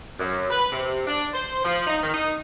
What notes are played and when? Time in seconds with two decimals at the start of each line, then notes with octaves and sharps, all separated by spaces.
0.19 F#2
0.50 B4
0.72 C3
1.07 D4
1.34 C5
1.65 F3
1.87 D#4
2.03 D#3
2.14 D#4